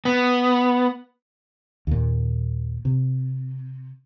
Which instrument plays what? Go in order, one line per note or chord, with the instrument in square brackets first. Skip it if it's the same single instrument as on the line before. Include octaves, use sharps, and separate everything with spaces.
[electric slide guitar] B3
[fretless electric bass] D#2 A#2
C3